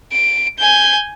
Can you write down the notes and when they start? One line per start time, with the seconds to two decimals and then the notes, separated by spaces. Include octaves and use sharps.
0.12 D7
0.59 G#5 G6